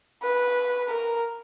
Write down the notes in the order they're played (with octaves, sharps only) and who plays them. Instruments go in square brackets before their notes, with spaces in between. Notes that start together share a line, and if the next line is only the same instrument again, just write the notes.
[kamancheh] B4
A#4